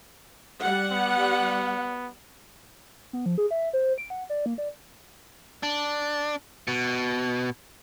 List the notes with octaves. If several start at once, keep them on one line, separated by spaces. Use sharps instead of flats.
G3 F#5
B3
B3
F3
G#4
E5
C5
D7
F#5
D5
A#3
D5
D4
B2